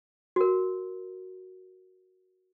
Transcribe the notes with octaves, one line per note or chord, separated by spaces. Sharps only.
F#4 A#4